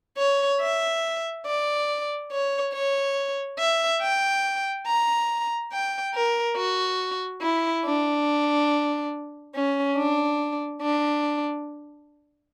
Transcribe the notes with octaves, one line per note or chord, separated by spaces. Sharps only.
C#5
E5
D5
C#5
C#5
E5
G5
A#5
G5
A#4
F#4
E4
D4
C#4
D4
D4